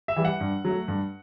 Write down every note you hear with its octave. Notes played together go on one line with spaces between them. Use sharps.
E5
E3 G3
F#5
G2
F#3 A3
G2